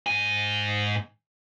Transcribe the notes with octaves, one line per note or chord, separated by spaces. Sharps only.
G#2 G#5